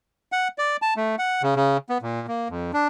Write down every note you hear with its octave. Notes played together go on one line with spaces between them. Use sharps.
F#5
D5
A5
A3
F#5
C#3
C#3
B3
A#2
A#3
F2
D4